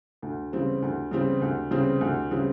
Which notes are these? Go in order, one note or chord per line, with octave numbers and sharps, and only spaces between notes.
D2
C#3 E3 G3 C4
D2
C#3 E3 G3 C4
D2
C#3 E3 G3 C4
D2
C#3 E3 G3 C4